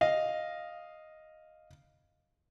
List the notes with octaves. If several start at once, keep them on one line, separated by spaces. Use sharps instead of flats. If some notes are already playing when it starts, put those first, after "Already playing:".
D#5 F5